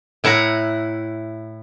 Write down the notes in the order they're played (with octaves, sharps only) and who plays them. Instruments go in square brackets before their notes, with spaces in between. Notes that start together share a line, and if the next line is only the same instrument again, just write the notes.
[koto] A2 E4 F#5 A#5